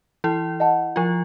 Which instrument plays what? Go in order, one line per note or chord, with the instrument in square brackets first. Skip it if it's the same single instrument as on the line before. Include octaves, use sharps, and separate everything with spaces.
[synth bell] E3 E4
[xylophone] D#5 F#5 A5
[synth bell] F3 F4